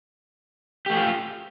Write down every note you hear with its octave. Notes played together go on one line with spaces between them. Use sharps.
A3 F4 G4 G#4